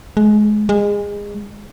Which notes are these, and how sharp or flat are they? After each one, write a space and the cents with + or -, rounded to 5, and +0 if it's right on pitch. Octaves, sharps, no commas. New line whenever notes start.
G#3 +25
G#3 -25